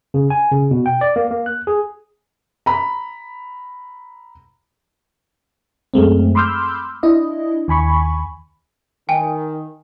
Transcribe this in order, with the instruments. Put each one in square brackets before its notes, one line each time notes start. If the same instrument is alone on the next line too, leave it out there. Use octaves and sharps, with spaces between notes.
[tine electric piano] C#3
G#5
C#3
B2
G5
D5
A#3
A#3
F#6
G#4
[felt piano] A#5 B5
[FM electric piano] F#2 G#3 A3 C4
B5 C6 D6 E6 F6 G6
D4 E4 D#5
D#2 G#5 B5 C#6
[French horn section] D#3 [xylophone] G5 G#5